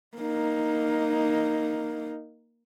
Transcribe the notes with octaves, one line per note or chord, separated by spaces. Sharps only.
A#3 D#4